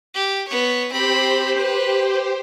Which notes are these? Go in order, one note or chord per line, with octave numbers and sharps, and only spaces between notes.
G4
B3 C#5
C4 G4 C5 B5
B4